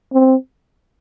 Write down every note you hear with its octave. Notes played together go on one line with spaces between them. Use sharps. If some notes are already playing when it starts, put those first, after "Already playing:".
C4